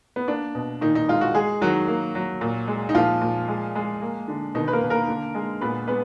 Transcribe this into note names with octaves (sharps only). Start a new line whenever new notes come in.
B3
A#3 D4
B2
A#2 D#3 D#4
D#4
G#3 F4
F#4
G#3 G#4
D#3 F#3 F#4
A#3
F#3
A#2
G#3
D#4
A#2 F3 F4
A#2
G#3
G#3
A#3
D3
B2 D#3 D#4
B4
A#3 A#4
B2
A#3 A#4
D3
G#3
A#2 B3 B4
G#3 B3 B4